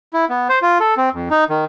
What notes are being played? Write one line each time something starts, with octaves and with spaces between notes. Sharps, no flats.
E4
B3
C5
F4
A4
C4
F2
D#4
D#3